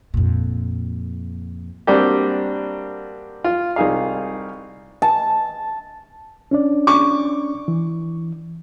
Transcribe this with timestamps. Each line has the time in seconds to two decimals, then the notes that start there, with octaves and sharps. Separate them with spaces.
0.14 F2 A#2
1.87 G3 A#3 C4 D4 F#4 G4
3.44 F4
3.76 C2 D#4 G#4 F5
5.02 A5
6.51 C#4 D4 D5
6.87 C#6 D6
7.68 E3